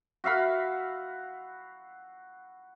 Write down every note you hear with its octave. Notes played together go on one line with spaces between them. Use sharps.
F#4 E5 F5 B5